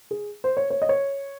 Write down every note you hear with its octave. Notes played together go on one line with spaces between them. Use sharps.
G#4
C5
C#5
C#5
D#5
C#5